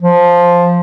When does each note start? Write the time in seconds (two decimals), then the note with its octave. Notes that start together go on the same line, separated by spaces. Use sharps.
0.02 F3